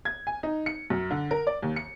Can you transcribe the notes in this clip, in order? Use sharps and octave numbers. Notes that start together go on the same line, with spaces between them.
G#6
G#5
D#4
C#7
F#2
D3
A#4
D5
D#2
C#7